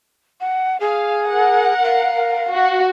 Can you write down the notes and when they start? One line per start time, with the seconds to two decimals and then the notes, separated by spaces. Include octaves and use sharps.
0.40 F#5
0.80 G#4 F5
1.26 A#4 F#5
1.84 F5
2.49 F#4